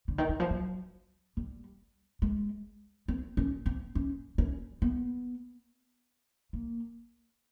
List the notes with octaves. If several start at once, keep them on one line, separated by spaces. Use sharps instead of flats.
D3
D#3
E3
F3
F#3
G3
G#3
C4
C#4
C4
C#4
C#4
B3
A#3